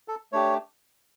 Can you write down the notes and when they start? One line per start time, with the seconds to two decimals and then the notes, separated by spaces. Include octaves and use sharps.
0.08 A4
0.32 A3 D4 G4 C#5